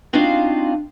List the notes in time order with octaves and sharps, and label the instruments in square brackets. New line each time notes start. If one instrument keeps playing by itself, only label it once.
[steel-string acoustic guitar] C4 D4 D#4 F4 F#4 F5